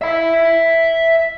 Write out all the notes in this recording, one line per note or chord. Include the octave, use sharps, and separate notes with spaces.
E5 B5